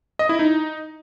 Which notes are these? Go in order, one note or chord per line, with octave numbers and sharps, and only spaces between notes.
D#5
E4
D#4